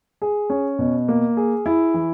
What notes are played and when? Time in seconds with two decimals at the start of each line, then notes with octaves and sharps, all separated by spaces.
0.22 G#4
0.50 C#4
0.79 B2
1.08 A#3
1.37 G#4
1.66 E4
1.94 E3